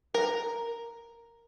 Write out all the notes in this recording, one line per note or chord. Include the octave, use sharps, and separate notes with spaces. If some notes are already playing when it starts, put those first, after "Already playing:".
A#4